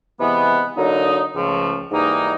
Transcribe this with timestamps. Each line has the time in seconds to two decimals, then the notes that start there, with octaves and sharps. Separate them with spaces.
0.19 C3 E3 G#3 B3
0.75 D3 F#3 A#3 D#4
1.34 C#2 C#3 F3 A3
1.91 G#2 E3 G3 A#3 D#4